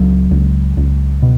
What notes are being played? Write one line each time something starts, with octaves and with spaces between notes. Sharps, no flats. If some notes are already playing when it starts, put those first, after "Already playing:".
Already playing: C#2 F#3
C#2
C#2
B2